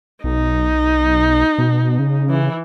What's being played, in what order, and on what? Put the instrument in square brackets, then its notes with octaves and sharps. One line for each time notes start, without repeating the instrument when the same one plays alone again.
[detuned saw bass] B1 [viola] D#4
[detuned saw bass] B2
C#3
[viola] E3